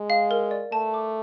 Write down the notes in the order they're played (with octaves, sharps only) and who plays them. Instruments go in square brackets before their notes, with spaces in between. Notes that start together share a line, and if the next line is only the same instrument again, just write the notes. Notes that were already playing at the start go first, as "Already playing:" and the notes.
Already playing: [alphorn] G#3
[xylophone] F5
A#4
D5
[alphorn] A3 [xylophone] A5
[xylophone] D6